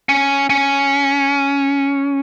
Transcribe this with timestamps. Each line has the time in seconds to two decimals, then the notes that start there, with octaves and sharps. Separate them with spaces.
0.09 C#4
0.50 C#4